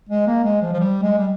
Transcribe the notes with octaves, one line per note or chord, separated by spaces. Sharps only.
G#3
A#3
G#3
F3
F3
G3
G#3
G3